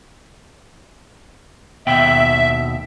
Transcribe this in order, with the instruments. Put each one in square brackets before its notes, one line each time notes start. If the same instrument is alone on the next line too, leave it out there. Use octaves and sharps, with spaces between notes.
[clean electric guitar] D#2 B2 G5 [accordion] E5